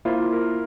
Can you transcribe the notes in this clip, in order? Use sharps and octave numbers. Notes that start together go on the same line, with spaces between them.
A#3 E4 F4 C5
A#4